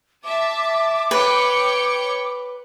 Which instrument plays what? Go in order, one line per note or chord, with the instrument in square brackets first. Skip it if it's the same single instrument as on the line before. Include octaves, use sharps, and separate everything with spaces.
[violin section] E5 A5 [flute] D6
[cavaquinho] B4 [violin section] C#5 G5 C#7